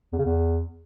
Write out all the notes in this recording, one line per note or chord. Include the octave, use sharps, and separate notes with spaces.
E2
C#3
E2